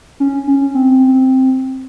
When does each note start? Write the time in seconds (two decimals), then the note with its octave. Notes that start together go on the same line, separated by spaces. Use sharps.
0.20 C#4
0.47 C#4
0.74 C4